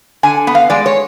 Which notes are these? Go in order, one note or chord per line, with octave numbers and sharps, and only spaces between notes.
D3 G#5
B3
F5
G#3 D5
C#5